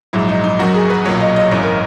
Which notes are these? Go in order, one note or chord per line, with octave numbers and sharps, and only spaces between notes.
A#1 G#2 F#3 E4
D#4
D#4
F#2 D#3 F#3 F#4
G#4
B4
B1 A#2 F#3 C#5
D#5
D#5
G#1 F#2 E3 C#5
A#4